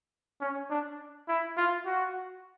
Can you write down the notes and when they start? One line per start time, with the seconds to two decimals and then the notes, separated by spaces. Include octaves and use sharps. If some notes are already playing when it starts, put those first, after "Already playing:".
0.41 C#4
0.70 D4
1.28 E4
1.57 F4
1.86 F#4